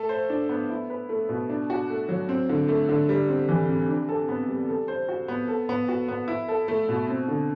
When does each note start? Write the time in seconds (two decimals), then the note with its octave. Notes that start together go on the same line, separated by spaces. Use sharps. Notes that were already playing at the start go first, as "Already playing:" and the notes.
Already playing: A3 A4
0.09 C5
0.30 D4
0.49 B3
0.70 E4
0.90 B4
1.09 A3
1.29 B2
1.49 D4
1.70 F#4
1.90 A3
2.09 F#3
2.29 C4
2.49 D3
2.68 A3
2.89 D3
3.09 G3
3.29 C4
3.49 E3
3.69 C3
3.89 D4
4.09 A4
4.29 B3
4.49 G3
4.69 A4
4.88 C5
5.09 F#4
5.28 B3
5.48 A4
5.69 B3
5.88 F#4
6.08 B3
6.28 E4
6.48 A4
6.68 A3
6.89 B2
7.09 C4
7.28 D3